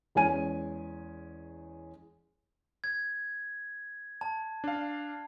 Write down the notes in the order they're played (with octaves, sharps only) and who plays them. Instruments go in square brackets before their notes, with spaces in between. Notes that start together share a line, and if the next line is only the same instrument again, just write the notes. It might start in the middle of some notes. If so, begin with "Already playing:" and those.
[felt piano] E2 G#3 C#4 G#5 D#7
[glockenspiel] G#6
A5
[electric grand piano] D4 F5